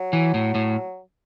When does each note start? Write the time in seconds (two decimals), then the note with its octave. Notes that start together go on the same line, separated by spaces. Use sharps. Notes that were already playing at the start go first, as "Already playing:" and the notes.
Already playing: F#3
0.13 E3
0.34 A2
0.55 A2